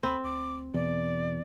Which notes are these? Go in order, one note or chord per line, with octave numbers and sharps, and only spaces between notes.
D2 C4 B5
D2 D6
E2 B2 D5